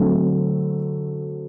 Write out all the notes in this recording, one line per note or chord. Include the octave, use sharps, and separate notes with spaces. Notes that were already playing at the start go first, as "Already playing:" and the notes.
Already playing: D3 F#3 A3 C4